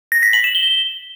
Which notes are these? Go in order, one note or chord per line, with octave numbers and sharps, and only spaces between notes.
A#6
B6
F#7
E7
G7